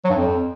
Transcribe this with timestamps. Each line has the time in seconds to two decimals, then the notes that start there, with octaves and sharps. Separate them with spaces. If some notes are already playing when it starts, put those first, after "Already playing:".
0.04 F#3
0.10 G2
0.16 F2